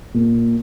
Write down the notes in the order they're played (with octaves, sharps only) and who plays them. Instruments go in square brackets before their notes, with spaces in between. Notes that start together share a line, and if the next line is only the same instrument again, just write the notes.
[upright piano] A#2